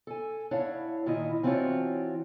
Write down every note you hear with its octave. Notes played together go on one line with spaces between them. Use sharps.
A4 G#5
D4 E4 C#5 F5 F#5
A#2 D#3 E4 F4 D#5
E3 C4 D4 F4 F#4 C#5